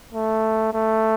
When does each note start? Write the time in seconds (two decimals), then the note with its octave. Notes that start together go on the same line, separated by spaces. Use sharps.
0.13 A3
0.74 A3